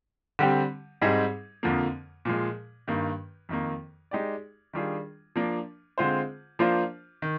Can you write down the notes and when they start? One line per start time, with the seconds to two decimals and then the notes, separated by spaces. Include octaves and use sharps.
0.39 D3 G3 C4 G4
1.02 G#2 G3 C4 D#4 G#4
1.63 F2 D3 F3 A#3
2.25 A#2 F3 G#3
2.88 G2 D#3 A#3
3.49 F2 D#3 A#3
4.11 G#3 D#4 G4 D5
4.73 D#3 G3 D4 F4 G#4
5.36 F3 A#3 D4
5.98 D3 G#3 C4 F4 C5
6.59 F3 A#3 D4 F4 C5
7.22 D#3